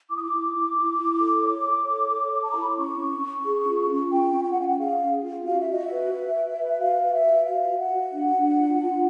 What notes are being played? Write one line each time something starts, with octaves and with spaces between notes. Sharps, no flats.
E4 D6
D#6
D6
E4
E4
E4
E4
A4
C#5
A4
C#5
A4
C#5
A5
A#5
E4 B5
C6
C#4 C#6
C#4
C#4
G#4
F4
C#4
F4 G5
C#4
G5
F#5
C#4 F5
F#5
G#4 F5
C#4
F4
F#4 F5
E5
F#4 D#5
B4 E5
B4
B4
B4
F#4 F5
B4
E5
B4
F#4 F5
F#4
F#5
F#4
D4
D4
F4
F4